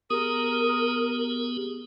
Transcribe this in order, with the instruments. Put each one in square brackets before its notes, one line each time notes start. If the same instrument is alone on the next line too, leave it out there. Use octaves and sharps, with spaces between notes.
[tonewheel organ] B3 G4 G#4 [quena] A#4 [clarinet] D#6